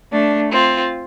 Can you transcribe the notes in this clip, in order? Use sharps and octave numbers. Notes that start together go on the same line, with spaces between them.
A3 D4
C4 F4